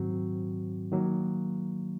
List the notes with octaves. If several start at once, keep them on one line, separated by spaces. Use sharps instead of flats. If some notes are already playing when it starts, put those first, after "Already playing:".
Already playing: G#2 D#3 F#3 C4 F#4
D#3 F#3 A#3